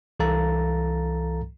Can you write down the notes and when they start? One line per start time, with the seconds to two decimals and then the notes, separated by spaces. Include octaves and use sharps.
0.20 C2 E3 A4 F5 A#5 A6